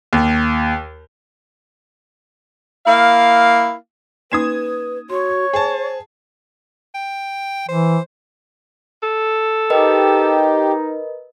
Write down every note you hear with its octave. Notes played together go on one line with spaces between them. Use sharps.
D#2
A#3 E4 F5
A#3 C#4 D#4 B4 D#6 G#6 E7
F#4 C#5 C6
G#4 C5 A5
G5
E3 C5
A4
D#4 G4 A#4 B4 D#5